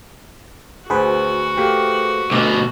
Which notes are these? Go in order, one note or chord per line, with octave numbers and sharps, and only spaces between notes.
D2 F#4 G#4 B4 C5
A3 A#3 G4
D2 B2 D6